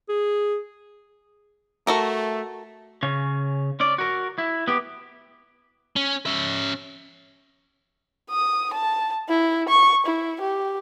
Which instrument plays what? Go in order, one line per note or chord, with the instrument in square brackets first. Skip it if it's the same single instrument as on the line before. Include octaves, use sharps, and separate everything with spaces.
[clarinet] G#4
[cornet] A3 [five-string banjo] F#4 A4 A#4
[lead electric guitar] C#3 C#4
C#4 D5
F#4 A#4
E4
B3 G4
[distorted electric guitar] C#4
C#4 E5
[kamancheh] D#6
A5
E4
C#6
E4
G4